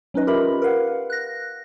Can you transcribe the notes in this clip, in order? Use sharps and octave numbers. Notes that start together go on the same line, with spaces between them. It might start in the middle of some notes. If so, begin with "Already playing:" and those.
F#3 C#4 D#4 B4 D#5
F4 G4 A#4 E5 B5
A#4 B4 F5 F#5
F#6 A#6